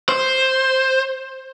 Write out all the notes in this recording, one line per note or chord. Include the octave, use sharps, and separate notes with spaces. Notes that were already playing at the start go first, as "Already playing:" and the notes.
C5